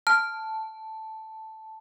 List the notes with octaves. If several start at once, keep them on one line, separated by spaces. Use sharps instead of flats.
A5 F6